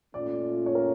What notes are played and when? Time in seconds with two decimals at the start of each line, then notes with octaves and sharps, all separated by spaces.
0.14 A#2 A3 C#4 F4 D5
0.66 C#5
0.75 A#4